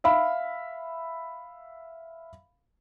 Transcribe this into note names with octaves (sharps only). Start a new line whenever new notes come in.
E5 F5 B5